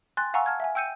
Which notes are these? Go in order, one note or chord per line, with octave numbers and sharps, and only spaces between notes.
G5 G#5 C6 F#6 A6
F5 F#5 G#5 A#5 C#6 E6
A5 F6 G#6
E5 F#5 G#5
G5 E6 G6 C#7 D#7